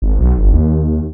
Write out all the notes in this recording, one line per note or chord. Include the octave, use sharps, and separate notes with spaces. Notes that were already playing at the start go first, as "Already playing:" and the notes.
G#1
B1
G1
D#2